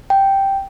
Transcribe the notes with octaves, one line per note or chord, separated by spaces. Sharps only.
G5